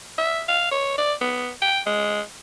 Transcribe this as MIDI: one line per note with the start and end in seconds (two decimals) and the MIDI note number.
0.18 0.41 76
0.48 0.68 77
0.71 0.97 73
0.98 1.13 74
1.21 1.49 59
1.62 1.79 79
1.86 2.21 56